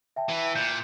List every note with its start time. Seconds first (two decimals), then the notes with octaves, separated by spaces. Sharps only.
0.16 E5 G5 A5
0.29 E3
0.55 A#2 G6 G#6